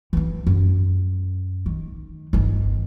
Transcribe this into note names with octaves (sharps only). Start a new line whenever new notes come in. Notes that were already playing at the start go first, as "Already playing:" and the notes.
E3 C4
F#2
D#3
G1 D#3